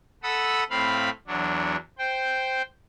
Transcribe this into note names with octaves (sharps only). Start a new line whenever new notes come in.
A4 F#5 B5 D#6 E6
A2 C4 F5 B5
E2 F#3 D4
C5 G5